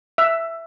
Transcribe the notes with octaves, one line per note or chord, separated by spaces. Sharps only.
E5